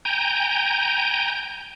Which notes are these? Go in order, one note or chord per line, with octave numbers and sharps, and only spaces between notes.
G5 G#5 A#5 G6